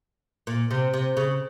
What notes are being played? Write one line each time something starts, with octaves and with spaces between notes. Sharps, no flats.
A#2
C3
C3
C#3